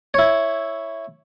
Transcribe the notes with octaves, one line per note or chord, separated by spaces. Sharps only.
E4 C#5